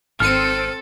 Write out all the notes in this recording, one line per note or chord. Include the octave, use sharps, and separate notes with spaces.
G#1 C4 A4 F6 C#7 D#7